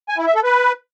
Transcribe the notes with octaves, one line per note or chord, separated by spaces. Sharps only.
G#5
E4
E5
A4
B4